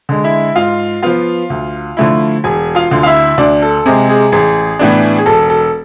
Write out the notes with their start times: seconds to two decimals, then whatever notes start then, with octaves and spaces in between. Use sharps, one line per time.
0.09 D3 G#3
0.24 E4 E5
0.55 G#2 F4 F5
1.02 F3 B3 F4 F5
1.50 D2
1.97 D3 F3 A3 E4
2.44 E1 G#4 G#5
2.75 F4 F5
2.91 D2 D3
3.03 F5
3.07 E4 E5
3.38 D2 D4 D5
3.62 A4
3.86 C3 G#3 G#4
4.09 G#4
4.32 A1 G#4
4.79 A2 E3 B3 D4
5.18 G#4
5.26 E1 A4
5.50 A4